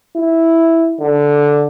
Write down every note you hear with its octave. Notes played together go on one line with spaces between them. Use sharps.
E4
D3